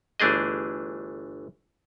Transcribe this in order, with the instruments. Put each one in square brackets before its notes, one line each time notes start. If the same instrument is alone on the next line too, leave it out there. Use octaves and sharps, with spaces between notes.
[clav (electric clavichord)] G1 E3 A3 D4 G#4 D#5